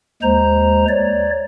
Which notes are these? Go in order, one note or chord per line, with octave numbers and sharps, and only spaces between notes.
D#2 G#3 C5 A#5
C#5 D5